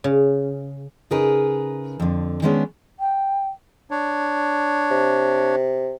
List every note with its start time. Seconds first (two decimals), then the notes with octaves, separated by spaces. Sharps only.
0.04 C#3
1.11 C#3 D#4 G#4 A#4 B4
2.00 F2 D3
2.42 D#3 G3 G#3 B3 C#4 D4
3.00 G5
3.91 D4 C#5
4.91 C3